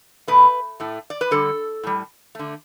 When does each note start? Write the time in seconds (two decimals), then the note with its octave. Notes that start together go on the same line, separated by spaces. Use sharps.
0.28 B2 A3 B4
0.80 A2 A3
1.10 D5
1.21 B4
1.31 D3 G3 A4
1.83 A2 G3
2.35 D3 A3